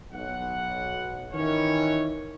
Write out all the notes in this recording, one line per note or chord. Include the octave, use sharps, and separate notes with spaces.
B1 F#5
D#3 E3 C#4 C#5